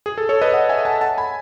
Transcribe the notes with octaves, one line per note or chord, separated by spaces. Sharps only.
G#4
A4
A4 C#5
B4 D#5
D#5 F#5
E5 G#5
F#5 A5
F#5 A5
G#5 B5